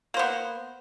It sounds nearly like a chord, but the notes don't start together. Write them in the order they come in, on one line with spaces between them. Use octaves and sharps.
A#3 C5 B3